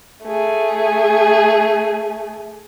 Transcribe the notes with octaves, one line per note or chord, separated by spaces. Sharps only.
A3 G#4